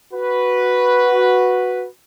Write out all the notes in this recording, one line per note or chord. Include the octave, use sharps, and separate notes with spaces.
F#4 B4